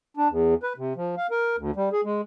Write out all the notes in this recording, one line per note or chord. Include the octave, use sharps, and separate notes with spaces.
D4
E2
B4
C3
F3
F5
A#4
D2
G3
G#4
G#3